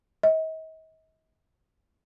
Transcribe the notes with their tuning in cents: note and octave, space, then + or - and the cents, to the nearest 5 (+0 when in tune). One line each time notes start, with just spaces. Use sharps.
D#5 +40